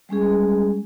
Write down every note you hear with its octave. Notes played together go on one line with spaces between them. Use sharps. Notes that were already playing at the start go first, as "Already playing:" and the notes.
G3 G#3 C#4 G#4